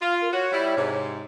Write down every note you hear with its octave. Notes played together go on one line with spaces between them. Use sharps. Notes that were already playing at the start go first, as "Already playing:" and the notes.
F4 F5
A#4
F#4 C#5
G3 E4
G#2 C3